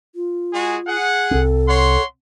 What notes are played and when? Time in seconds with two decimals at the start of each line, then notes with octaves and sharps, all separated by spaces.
0.15 F4
0.53 G#3 F#4 G#4
0.87 G#4 F#5
1.31 C2 C4 A4
1.68 C#5 F#5 C6